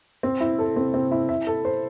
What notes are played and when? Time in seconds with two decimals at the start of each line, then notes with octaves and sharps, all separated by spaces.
0.23 C4
0.41 E4
0.59 A4
0.76 C4
0.94 C4
1.11 E4
1.29 E5
1.47 A4
1.65 C5